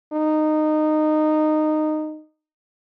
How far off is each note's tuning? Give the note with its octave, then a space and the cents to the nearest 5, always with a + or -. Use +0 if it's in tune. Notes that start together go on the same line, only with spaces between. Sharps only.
D#4 -15